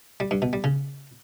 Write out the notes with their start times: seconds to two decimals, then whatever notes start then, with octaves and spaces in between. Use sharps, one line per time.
0.20 G3
0.31 G2
0.42 B2
0.53 G3
0.64 C#3